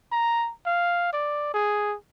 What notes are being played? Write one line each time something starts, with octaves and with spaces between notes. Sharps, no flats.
A#5
F5
D5
G#4